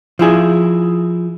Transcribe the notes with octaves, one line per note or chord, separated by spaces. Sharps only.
F3 E4 G#4